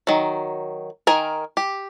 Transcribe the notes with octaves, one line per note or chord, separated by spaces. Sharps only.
D#3 F#3
D#3 A#4 G#5
G4